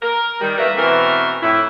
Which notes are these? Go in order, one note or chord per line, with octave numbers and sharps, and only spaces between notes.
A#4
D#3 G3
A3 A#3 A#4 B4 E5
B2 E3 A3 C4 A#4
F2 A2 E4